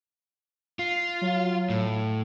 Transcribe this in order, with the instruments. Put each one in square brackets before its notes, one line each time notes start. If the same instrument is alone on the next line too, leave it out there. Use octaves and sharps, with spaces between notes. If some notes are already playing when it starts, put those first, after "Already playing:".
[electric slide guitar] F4 [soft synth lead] C7
[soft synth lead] F#3
[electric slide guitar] A2